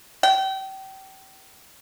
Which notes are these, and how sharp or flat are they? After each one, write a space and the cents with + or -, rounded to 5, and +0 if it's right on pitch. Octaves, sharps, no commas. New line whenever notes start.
G5 -30